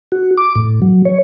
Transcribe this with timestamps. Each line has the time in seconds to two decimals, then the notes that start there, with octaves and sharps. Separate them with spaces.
0.12 F#4
0.38 D6
0.55 A2
0.82 F#3
1.05 C#5